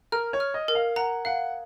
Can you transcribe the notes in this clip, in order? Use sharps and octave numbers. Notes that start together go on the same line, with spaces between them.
A#4 F6
C#5
F6
D#5
A#4
F5
F#5 A#5
F5 F#5